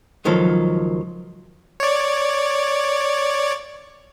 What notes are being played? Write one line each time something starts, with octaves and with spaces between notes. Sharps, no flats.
C#2 D#3 F3 F#3 A4
C#5 D5